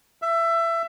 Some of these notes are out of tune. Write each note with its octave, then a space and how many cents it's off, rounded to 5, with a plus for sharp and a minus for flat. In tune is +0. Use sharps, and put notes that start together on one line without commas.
E5 +20